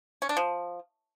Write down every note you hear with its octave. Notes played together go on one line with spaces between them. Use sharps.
C#4
D4
F3